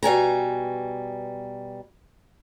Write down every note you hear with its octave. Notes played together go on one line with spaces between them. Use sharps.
B2 G3 G#5 A#5